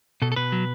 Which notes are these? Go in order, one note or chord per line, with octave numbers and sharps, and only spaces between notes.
B2 A4
A4
B2 B4
F#3